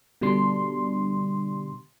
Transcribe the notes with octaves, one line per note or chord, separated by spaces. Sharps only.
B2 D3 G3 D4 C6